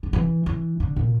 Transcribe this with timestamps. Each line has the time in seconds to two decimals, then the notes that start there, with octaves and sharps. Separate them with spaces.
0.03 D3
0.13 E3
0.46 E3
0.80 D3
0.96 A#2